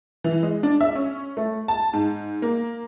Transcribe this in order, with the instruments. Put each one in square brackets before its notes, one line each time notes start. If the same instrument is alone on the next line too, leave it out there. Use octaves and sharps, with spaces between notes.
[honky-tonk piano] E3
G#3
D4
E5
C#4
A3
A5
G#2
A#3